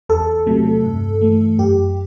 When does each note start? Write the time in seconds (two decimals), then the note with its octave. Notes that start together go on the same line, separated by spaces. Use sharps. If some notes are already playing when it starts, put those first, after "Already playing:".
0.09 E2 A4
0.46 C3 F#3 A3
0.84 G2
1.21 E3 A3
1.58 F#2 G4